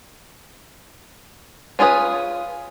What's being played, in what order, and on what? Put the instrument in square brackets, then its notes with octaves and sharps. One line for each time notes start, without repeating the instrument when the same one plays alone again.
[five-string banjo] C#4 D4 F4 G#4 B4